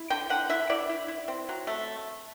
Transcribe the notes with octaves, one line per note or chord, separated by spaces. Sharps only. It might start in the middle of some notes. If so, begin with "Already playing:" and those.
Already playing: E4
D3 G5
D3 F#5
E4 E5
E4 D5
E4
E4
C4
F#3
A3